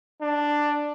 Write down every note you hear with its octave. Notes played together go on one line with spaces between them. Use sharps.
D4